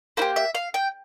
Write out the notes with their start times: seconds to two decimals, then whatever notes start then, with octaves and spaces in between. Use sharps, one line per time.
0.17 A#3 E4 C5
0.21 G4
0.36 E5
0.55 F5
0.74 G5